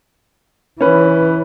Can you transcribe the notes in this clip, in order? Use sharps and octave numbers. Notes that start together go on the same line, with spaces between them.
E3 C#4 B4